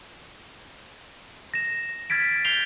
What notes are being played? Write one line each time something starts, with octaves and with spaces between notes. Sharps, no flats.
A#6 E7
F6 G#6 A6 B6 D7
G6 C7 D7 F7 G7